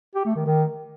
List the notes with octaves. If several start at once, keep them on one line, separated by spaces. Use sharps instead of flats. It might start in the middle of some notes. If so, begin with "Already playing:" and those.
G4
A3
D#3
D#3